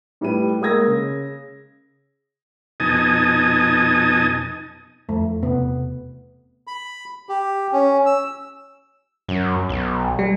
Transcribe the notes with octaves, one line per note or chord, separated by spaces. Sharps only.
A2 G3 E4 B4 D#7
G#3 A#3 D#6 E6 G#6 A#6
C#3
F2 B2 D#4 G#5 A5 D#6
F2 A3
E1 C3 B3
B5
G4
C#4
E6
F#2
B1
G3